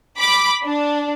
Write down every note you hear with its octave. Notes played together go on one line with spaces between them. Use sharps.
B5 D6
D4